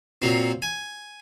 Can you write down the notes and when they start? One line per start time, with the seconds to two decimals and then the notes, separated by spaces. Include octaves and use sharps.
0.22 A#2 F#3 C4
0.62 G#5